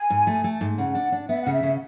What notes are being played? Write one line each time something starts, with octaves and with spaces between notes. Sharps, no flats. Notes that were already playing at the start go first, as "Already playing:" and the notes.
Already playing: G#5
G#2
A3
A3
G#2
C#3 F#5
D4
D4
B3 E5
F#5
C#3
E5
C#3